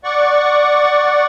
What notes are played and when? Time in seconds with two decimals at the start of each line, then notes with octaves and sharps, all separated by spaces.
0.04 D5 F#5 C#6